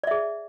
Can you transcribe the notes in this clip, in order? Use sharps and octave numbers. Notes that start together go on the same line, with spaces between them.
G#4 D5 E5